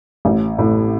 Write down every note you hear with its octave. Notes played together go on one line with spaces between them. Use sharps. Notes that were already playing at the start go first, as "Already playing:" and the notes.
A1
A2